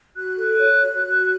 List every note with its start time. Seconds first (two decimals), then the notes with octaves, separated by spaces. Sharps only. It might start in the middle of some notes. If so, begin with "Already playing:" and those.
0.16 F#4 F#6
0.38 A4
0.60 C#5
0.82 F#4
1.04 F#4